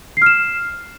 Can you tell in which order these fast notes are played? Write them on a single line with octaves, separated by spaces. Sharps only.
C7 F6 E7